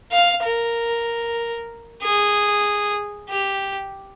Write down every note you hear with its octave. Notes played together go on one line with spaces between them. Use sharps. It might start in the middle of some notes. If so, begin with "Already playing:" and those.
F5
A#4
G#4
G4